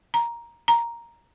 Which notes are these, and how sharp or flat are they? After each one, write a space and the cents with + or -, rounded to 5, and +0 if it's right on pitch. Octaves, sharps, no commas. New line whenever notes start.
A#5 +10
A#5 +5